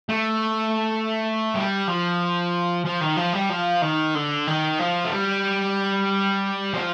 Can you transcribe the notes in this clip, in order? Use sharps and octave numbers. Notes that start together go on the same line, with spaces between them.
A3
G3
F3
F3
D#3
F3
G3
F3
D#3
D3
D#3
F3
A3
G3
F3